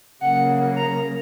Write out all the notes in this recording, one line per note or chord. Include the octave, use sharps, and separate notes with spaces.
C#3 F#3 A#3 F#5
A#5